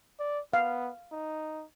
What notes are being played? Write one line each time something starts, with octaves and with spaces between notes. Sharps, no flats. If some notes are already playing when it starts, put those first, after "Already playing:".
D5
B3 F5
D#4